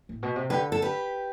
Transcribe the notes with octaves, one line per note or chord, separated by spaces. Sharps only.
A2
B2
C3
D3 G4 B4
A4
G4 B4